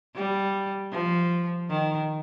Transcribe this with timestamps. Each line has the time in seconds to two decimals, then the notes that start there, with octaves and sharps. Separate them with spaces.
0.15 G3
0.92 F3
1.70 D#3